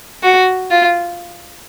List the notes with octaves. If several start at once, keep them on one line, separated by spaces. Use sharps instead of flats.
F#4
F4